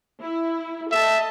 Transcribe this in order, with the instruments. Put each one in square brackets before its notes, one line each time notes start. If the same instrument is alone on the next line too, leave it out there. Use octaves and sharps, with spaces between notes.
[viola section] E4
[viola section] A4 D#5 A5 [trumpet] E5